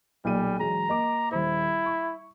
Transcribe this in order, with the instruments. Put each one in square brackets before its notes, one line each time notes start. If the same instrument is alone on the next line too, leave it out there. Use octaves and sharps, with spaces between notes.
[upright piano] B1 A#2 D#7 [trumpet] G3
[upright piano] E1 F#3 G#3 [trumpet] A#5
[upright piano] A#3 D#5 D6
[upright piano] D#1 C5 [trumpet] E4
[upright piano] C#6